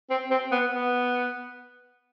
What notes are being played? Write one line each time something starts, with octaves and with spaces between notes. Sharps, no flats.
C4
C4
B3
B3